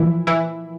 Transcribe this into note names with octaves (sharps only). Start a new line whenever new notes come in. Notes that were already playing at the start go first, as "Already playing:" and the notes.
Already playing: A#2 E3 F3 E4
E3 E4